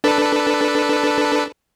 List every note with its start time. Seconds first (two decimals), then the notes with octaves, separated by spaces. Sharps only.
0.04 D4 A4 B4